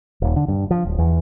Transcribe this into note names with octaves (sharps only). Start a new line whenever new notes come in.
D#1
D3
G2
F3
D1
E2